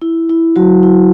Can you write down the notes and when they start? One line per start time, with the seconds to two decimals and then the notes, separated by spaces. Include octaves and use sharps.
0.02 E4
0.29 E4
0.56 F#3 F#4
0.83 E4